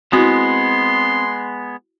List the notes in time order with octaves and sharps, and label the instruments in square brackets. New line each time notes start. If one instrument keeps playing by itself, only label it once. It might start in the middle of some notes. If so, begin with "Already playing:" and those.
[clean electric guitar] G#3 B3 [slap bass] C4 [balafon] E4 F#4 [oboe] C6